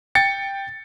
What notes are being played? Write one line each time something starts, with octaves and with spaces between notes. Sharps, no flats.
G5 A6 C#7